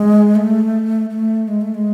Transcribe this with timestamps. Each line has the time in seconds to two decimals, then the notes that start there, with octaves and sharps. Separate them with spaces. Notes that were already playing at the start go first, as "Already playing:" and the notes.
Already playing: G#3
0.36 A3
1.10 A3
1.48 G#3
1.61 A3
1.75 G#3